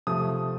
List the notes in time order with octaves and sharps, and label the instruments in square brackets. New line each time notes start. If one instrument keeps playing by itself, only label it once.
[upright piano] C3 F3 A3 D#6